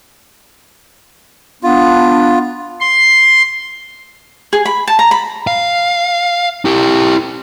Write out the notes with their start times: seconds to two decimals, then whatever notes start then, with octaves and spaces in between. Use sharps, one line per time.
1.63 B3 D4 F4
2.80 C6
4.53 G#4
4.66 B5
4.87 A5
4.99 A#5
5.11 B5
5.47 F5
6.65 E4 G4